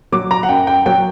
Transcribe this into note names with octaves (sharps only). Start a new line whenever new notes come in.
F#3 D6
A#5
F#5
F#2 G5
G5
F#3 G5